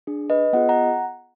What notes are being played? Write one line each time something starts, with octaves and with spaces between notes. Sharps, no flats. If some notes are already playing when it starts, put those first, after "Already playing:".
D4 G#4
B4 D#5
B3 F4 G#4 D#5 F#5
F#5 A#5